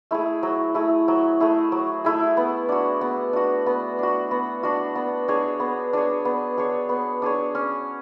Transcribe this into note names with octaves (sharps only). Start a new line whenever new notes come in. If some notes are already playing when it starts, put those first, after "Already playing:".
A3 E4 G#4
F#3
A3 E4 G#4
F#3
A3 E4 G#4
F#3
A3 E4 G#4
B3
D4 F#4
B3
D4 F#4
B3
D4 F#4
B3
D4 F#4
B3
D4 G#4 C#5
B3
D4 G#4 C#5
B3
D4 G#4 C#5
B3
D4 G#4 C#5
C#4